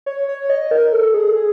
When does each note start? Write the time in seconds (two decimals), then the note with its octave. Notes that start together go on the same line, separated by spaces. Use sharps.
0.06 C#5
0.29 C#5
0.50 D#5
0.71 A#4
0.92 A4
1.14 G#4
1.35 G#4